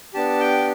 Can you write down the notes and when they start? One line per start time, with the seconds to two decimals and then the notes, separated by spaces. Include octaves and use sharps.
0.14 B3 D4 G4 A5
0.40 G5